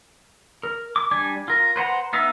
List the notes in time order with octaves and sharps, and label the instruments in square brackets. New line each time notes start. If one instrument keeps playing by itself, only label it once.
[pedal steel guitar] A#4
D6
G3 D4 G#5
F4 A#4
B4 C5 F#5 A#5
B3 D#4 E5 F5